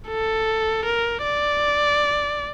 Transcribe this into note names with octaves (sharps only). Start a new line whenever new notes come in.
A4
A#4
D5